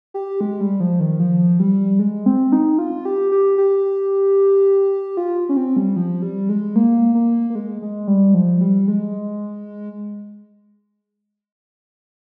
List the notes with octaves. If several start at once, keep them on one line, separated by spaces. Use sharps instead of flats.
G4
G#3
G3
F3
D#3
F3
G3
G#3
C4
D#4
F4
G4
G4
G4
F4
C#4
C4
G3
F3
G3
G#3
A#3
A#3
A#3
G#3
G#3
G3
F3
G3
G#3